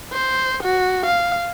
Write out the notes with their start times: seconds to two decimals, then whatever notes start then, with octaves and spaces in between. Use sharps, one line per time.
0.13 C5
0.63 F#4
1.06 F5